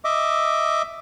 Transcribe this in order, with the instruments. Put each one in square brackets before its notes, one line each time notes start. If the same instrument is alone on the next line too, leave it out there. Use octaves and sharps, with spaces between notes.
[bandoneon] D#5 E5 D6